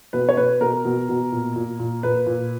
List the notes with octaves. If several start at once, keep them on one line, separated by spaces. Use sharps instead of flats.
B2 B4
C#5
B2 B4
B2 A#4
B2
B2
A#2
A#2
A#2
A#2 B4
A#2